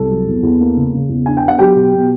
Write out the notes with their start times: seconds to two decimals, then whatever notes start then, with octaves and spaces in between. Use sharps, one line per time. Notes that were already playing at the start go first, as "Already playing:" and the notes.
Already playing: C2 A4
0.10 F#3
0.27 E2
0.43 E2
0.60 A#3
0.76 C#3
0.94 C#3
1.09 E2
1.26 D4 G#5
1.37 G5
1.43 B3
1.48 F#5
1.58 F#3 G4 G5
1.76 B2
1.93 B2